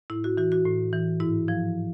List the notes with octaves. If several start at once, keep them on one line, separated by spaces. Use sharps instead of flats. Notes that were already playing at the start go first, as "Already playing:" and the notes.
A2 E4
F#4
E3 F#4
F#4
A2
E3
G#2 E4
F3